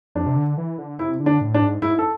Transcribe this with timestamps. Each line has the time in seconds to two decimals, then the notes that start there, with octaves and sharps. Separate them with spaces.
0.15 F2 D4
0.26 C3
0.36 D3
0.58 E3
0.78 D3
0.99 C3 E4
1.20 D3
1.26 D4
1.41 A2
1.54 D4
1.61 G#2
1.82 G#2 E4
1.99 A4